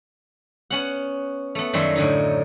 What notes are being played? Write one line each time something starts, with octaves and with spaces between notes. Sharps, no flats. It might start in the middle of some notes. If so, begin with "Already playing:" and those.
B3 C#4 F#5
A3 B3
F#2 D#3 F#3 G3 E5 C6
A2 D3 D#4